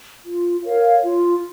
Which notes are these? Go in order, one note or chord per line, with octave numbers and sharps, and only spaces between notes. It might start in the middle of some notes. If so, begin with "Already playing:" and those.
F4
A#4 C#5 F5
F4